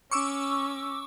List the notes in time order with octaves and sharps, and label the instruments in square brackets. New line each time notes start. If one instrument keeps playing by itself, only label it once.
[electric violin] C#4 [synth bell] C#6 D6 E6